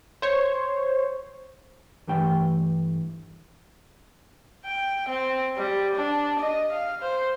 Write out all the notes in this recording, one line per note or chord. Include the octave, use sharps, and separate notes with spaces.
C5 C#5
G2 E3 A3 G5
G5
C4
G3
D4
D#5
F5
C5